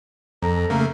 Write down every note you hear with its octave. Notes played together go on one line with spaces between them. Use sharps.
F2 A4 A#5
C#3 A3 A#3